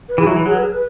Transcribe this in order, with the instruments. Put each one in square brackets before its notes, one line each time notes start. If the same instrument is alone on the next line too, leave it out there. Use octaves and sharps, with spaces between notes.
[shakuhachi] B4
[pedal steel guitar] E3 [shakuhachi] G#4
[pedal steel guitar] F#3 [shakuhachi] E4
[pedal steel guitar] E3
[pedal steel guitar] F#3 [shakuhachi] G#4
[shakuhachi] B4
G#4
B4